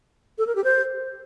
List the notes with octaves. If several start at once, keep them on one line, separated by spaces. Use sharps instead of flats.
A4
A#4
G4
C5